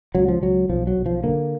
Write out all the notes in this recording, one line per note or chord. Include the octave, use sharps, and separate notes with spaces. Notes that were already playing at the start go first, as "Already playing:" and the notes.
C#2 F#3
F3
C#2 F#3
B1 F3
F#3
B1
F3
D3 A#3